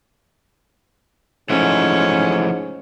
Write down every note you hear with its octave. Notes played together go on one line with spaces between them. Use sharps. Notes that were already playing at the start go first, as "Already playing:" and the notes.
G#2 E3 F3 A3 C#4